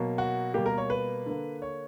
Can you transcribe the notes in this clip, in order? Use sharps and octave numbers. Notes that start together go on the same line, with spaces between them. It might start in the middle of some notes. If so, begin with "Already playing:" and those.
Already playing: B2 F#3 A#3
F#4
B2 G3 A#3 G4
A#4
C#5
B4
D3 A#3
C#5